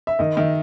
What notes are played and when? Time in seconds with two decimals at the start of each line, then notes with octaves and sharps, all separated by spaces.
0.07 E5
0.19 D#3 D#5
0.37 D#3 E5